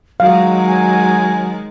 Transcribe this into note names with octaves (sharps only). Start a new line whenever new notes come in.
D#3 F#3 G#3 F5
G#5